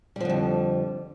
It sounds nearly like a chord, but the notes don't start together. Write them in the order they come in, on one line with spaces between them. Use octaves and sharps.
G3 F3 D3 F2